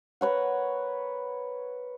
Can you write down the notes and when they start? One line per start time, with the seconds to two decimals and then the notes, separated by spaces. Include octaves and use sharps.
0.21 A#4 B4 C#5 F#5